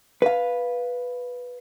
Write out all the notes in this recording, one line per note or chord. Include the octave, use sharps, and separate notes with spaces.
B4 F5